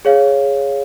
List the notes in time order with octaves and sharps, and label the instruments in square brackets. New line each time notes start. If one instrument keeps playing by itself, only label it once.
[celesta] G#4 C#5 F5